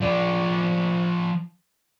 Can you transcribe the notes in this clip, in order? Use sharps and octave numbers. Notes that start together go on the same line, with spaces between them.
F3 D5